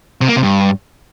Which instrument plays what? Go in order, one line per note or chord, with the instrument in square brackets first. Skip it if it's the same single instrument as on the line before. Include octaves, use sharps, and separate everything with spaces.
[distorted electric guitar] C3
A#3
C3
G2